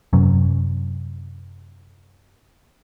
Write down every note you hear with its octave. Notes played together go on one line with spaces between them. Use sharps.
F#2 C3 F#3 C#4